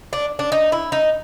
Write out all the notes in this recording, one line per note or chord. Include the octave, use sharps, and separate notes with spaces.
D4
D4
D#4
E4
D#4